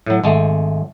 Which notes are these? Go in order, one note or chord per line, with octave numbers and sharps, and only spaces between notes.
A2 F#3
G#1 G#3 A3